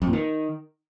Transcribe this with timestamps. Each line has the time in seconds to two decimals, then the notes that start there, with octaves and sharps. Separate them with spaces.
0.02 F2
0.07 A#2
0.13 D#3